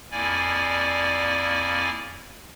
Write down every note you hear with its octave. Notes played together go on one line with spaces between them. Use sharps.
F2 A#3 E4 D5 G#5